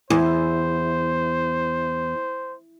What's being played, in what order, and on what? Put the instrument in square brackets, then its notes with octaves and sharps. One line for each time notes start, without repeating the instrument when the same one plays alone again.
[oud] E2 [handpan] E4 [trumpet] C5